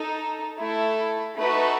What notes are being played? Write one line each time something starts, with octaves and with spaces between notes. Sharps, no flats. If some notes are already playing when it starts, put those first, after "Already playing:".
Already playing: D#4 A4
A3 E4 A4
A3 D#4 F#4 A4 B4